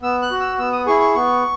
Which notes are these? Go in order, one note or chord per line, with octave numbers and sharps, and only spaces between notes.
B3 E6
F#6
F#4
E6
B3 E6
D#6
E4 G#4 C#6
C#6
B3 C#6